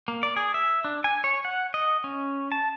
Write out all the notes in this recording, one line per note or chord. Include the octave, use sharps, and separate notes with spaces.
A#3
D5
G#4
E5
D4
G#5
C#5
F#5
D#5
C#4
A5